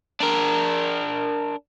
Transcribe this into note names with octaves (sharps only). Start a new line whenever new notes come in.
D4 A#4